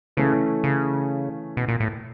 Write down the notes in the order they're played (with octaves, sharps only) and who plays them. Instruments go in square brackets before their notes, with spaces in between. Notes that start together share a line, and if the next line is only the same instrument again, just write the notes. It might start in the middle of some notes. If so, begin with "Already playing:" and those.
[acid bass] C#3 [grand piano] E3 A3 C#4
[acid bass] C#3
B2
A#2
A2